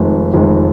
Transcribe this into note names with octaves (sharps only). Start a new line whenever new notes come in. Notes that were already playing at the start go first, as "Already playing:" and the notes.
Already playing: F1 F2 D#3 G#3
F1 F2 D#3 G#3